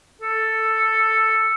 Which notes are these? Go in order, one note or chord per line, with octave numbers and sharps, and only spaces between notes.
A4